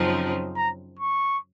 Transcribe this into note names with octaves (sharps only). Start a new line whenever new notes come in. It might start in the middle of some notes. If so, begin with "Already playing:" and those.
Already playing: F#2 C#3 F3 C4 D#4
A#5
C#6